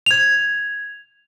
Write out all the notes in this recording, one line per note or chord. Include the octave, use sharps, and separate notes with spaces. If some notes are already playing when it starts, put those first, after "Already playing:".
G#6 F7